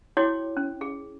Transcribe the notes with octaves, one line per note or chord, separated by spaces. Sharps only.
E4 F#4 C#5 G5 D6
C#4
G#4